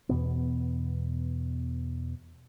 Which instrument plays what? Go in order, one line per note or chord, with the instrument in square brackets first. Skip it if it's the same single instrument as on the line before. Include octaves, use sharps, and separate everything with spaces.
[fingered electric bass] E2 B2 B3